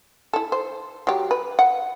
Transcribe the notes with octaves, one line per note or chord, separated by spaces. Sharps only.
E4 A4
C5
F#3 G4
B4
F#5